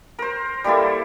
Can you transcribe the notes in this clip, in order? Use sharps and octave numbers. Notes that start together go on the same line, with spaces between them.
A#4 C5
G3 A#3 E4 A4